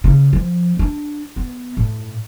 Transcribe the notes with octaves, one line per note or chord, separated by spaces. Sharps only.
C#3
F3
D4
B3
A2